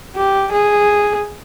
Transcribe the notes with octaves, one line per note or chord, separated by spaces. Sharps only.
G4
G#4